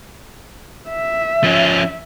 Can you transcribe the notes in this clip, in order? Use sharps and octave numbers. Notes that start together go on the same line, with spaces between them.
E5
F3 C#4